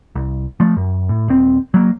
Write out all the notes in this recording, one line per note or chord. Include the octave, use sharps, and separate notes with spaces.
C2
F3 A3
F#2
A2
D#1 C4
F#3 A#3